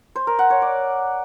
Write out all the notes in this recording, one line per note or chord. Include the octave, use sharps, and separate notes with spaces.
C5
A#4
F#5
C#5
D5